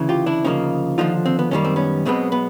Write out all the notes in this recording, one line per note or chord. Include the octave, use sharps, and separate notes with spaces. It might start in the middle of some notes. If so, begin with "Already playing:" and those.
Already playing: D2 C#3 E3
F4 G4
D4 E4
D2 C#3 F3 A#3 C#4 D#4
D#2 D3 F3 D#4 F4
C4
B3
F#2 D#3 G3 A#3 C#4
C4
B3 C#4
B1 B2 G#3 B3 C4
B3